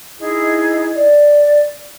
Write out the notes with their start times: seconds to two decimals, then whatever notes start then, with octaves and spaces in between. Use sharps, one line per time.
0.21 D#4 E4 G#4 D#5
0.96 D5